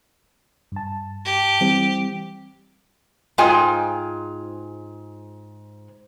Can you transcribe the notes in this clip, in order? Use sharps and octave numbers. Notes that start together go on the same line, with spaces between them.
G2 A5
G4
E3 G3 C4
G#2 F4 G#4 G5 G#5